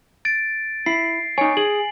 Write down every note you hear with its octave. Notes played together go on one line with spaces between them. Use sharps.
A6 D7
E4 C7
D#4 C#5 G#5
G#4 F#7